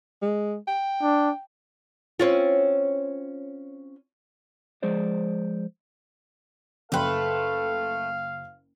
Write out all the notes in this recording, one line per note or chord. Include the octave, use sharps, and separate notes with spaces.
G#3
G5
D4
C4 C#4 F4
F3 G#3 G#4 C5 D5
F#1 A3 A4 B4 F5 G5 C6